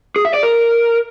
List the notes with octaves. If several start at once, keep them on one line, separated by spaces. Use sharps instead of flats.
G#4
E5
D5
A#4